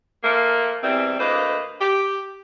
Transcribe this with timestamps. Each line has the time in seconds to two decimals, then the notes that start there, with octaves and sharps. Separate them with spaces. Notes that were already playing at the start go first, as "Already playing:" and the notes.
0.23 F3 A3 A#3
0.83 E2 E3 G3 C4
1.19 D2 A#3 B4 C5 D#5
1.80 G4